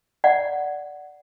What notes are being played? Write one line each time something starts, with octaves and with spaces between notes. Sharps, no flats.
D5 F#5